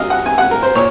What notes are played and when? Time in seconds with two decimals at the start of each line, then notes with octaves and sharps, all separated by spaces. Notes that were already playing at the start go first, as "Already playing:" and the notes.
Already playing: C3 F#3 D#5 F5
0.10 F#5
0.26 G#5
0.38 F#5
0.51 A#4
0.63 C5
0.75 A#2 C#5